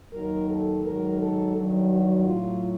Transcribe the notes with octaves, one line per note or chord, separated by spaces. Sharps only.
D#2 D#3 F#3 A#4
A4
G#2 D#3 F#3 A#4
A4
G2 D#3 F#3
F#4
A2 F#3 F4